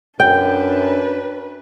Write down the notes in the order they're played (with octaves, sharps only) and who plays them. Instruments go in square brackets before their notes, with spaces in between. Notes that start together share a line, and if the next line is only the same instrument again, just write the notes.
[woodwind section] F#2 [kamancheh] D4 B4 [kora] G5